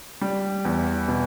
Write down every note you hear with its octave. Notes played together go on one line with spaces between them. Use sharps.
G3
E2
B2